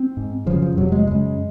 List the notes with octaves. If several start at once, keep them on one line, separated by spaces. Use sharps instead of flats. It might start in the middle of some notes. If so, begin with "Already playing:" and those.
Already playing: C4
G#2
F#2 C#3 F3
F3
F2 C3 F#3
G#3
F#2 C#3 G#3